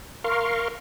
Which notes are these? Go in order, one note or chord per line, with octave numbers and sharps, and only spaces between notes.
A#4 F5 C6 C#6